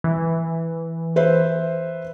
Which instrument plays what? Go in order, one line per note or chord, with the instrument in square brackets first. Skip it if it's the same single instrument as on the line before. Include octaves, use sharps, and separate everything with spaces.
[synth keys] E3
[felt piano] B4 C5 E5